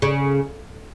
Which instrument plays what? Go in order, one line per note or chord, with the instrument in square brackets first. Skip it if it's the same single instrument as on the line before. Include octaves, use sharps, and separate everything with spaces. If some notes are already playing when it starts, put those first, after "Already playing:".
[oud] C#3